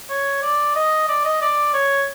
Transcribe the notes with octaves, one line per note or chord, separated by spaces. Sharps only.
C#5
D5
D#5
D5
D#5
D5
C#5